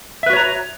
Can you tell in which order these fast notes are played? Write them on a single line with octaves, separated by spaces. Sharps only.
E5 B4 F#4 C#5 A#5